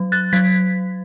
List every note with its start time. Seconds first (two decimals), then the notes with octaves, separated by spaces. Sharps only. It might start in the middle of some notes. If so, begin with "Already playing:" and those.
Already playing: F#3
0.12 F#6 A6
0.33 F#3 G#6 B6